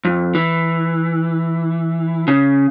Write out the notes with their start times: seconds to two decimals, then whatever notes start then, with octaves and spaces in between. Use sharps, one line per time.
0.05 F2
0.35 E3
2.28 C#3